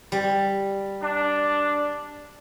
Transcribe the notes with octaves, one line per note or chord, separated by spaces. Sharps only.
G3
D4